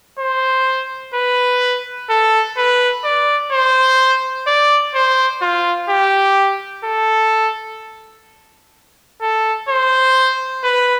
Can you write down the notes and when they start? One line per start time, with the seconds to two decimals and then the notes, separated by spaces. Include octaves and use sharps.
0.19 C5
1.15 B4
2.10 A4
2.57 B4
3.05 D5
3.52 C5
4.47 D5
4.95 C5
5.42 F4
5.90 G4
6.85 A4
9.22 A4
9.69 C5
10.64 B4